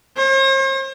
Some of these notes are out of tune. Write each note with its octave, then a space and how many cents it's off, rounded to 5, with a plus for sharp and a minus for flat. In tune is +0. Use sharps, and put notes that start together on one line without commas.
C5 +45